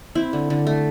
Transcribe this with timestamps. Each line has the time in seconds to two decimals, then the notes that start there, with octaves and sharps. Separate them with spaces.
0.15 C4 E4
0.33 D3
0.50 D3
0.67 A3